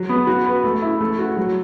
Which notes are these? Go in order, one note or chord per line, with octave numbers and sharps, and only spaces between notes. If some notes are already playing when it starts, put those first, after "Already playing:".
Already playing: F#3
B3
F#4
B4
A3
E4
A3
F#4
F#3